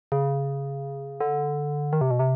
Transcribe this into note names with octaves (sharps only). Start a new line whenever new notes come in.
C#3
D3
D#3
C3
B2
C3